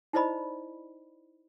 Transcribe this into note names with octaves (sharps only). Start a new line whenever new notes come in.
D#4 E4 C5 D5 D#5 B5